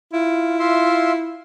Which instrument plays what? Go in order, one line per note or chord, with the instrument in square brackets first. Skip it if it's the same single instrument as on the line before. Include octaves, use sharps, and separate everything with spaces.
[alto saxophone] E4 [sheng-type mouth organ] F4
[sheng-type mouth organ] F4 E5 C6